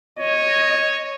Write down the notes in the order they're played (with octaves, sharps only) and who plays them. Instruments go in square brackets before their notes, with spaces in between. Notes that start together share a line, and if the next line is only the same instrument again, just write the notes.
[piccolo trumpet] C#5 [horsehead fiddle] D#5